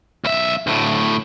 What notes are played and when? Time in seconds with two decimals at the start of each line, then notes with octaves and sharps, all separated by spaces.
0.25 B1 E5
0.67 D2 A2